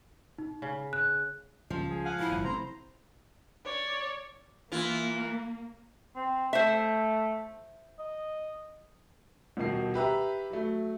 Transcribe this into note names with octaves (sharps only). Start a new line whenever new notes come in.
D#4
C#3
F#6
C#2 F3
G#4
F5 F#5 G#5
A2 E4
G1 F2
C3 F3 A3 C5 A#5
C#5 D5
E3 A#3 F4
C4
A3 C5 E5
D#5
D#1 B2 D#3 C7
G4 B4 E5 A#5
F#3 A3